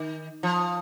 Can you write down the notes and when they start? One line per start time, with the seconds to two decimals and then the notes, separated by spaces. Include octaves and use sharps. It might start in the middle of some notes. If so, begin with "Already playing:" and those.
Already playing: D#3
0.43 F3